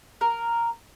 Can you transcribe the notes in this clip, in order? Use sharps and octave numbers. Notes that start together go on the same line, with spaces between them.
A#4